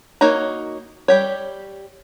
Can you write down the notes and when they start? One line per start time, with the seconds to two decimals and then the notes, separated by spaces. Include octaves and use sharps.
0.21 A#3 D#4 F#4 C#5 A#5
1.08 G3 G4 C#5